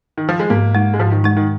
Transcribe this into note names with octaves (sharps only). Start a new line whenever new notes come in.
D#3
F3
G#3
G#2 A#3
G#3 D#4
G#3
G#2 F3
D#3
G#3 D#4
D#3